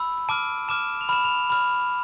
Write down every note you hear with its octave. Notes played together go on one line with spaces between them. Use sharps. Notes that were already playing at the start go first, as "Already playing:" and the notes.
Already playing: B5 E6
A5 D6 F6 D7
A5 D6 F6 E7
F7
B5 F6 E7
F7
B5 F6